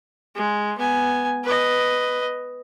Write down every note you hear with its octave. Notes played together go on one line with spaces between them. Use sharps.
G#3
B3 G#5
B4 D#5